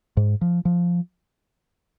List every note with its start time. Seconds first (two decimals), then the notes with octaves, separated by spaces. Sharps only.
0.17 G#2
0.41 F3
0.65 F3